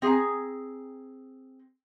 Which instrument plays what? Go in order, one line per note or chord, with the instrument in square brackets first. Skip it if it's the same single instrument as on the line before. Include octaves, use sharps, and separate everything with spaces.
[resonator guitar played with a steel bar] C4 G#4 F5 G#5 A#5